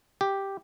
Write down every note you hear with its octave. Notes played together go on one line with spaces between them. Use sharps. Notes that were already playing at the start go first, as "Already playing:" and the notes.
G4